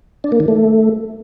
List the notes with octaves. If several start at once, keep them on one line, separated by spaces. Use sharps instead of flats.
D4
A#3
D#3
A3